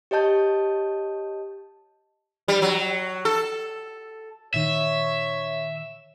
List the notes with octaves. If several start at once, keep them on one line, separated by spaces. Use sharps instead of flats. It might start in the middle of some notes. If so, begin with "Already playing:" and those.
G4 C#5 D#5 A5 G6
G3
F#3
A4
A#2 D#3 C#5 E5